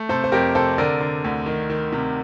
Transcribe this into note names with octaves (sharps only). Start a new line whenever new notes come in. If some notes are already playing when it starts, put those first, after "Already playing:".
Already playing: A3
C3 A4 C5
C5
F2 G4 A#4
C3 A4 C5
D3 A#4 D5
D3
D2
D#3
D#3
C3